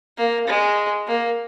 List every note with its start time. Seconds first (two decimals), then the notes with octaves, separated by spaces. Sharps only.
0.18 A#3
0.47 G#3
1.07 A#3